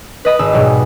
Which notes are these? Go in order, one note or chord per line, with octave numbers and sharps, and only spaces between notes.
B4 D#5 B5
G#1 E6
G#2 B2 F#3 G3